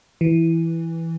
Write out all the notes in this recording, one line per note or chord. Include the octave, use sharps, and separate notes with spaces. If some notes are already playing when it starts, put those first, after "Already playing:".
E3